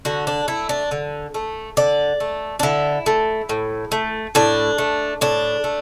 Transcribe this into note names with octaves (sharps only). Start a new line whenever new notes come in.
D3 F#4
D4
A3 E4
D4
D3
A3
D3 D5
A3
D4
D3 E4
A3
A2
A3
A2 D4
A3
A2 D4
A3